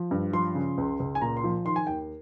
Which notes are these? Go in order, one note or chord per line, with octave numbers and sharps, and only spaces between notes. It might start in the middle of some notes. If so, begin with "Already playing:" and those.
Already playing: F3
G2
F3 C6
C#3
C#2
C#2
G#5
A#2 A#5
C6
F3
D#3 C6
G#5
D#2 G5